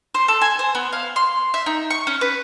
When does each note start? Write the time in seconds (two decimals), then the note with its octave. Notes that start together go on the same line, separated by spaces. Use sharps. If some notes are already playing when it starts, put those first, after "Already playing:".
0.14 C5
0.28 A4
0.41 G#5
0.59 C5
0.75 B3
0.93 F5
1.16 C6
1.54 E5
1.66 D#4
1.90 C#6
2.07 C#4
2.21 B4